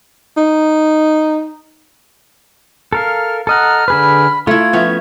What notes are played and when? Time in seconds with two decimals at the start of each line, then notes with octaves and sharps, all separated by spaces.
0.37 D#4
2.93 A4 A#4 F5 F6
3.47 A4 D#5 F#5 A#5 F6
3.88 D3 G#4 B4 B5
4.47 A3 E4 F4 G#6
4.73 F3 B3 C#4 E5